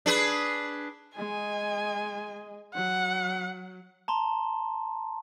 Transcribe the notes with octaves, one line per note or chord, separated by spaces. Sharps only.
D4 G#4 B4
G#3 D#5 G#5
F#3 F#5
A5 A#5 C6